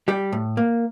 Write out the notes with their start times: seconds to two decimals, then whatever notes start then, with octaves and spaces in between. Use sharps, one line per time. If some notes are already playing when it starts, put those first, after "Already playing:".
0.08 G3 G4
0.32 A2
0.57 A#3